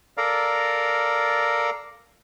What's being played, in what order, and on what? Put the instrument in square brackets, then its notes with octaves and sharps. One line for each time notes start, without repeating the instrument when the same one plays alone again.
[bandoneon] A4 A#4 D5 F5 A#5